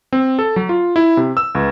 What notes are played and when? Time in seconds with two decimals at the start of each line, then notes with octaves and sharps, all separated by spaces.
0.13 C4
0.39 A4
0.56 F#3
0.69 F4
0.96 E4
1.17 C3
1.37 E6
1.55 C#2